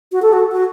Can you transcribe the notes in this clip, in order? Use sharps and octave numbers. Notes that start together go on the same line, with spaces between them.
F#4
A4
F#4
F#4